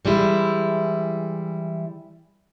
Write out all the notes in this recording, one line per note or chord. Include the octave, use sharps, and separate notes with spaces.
E3 G3 G#3 E4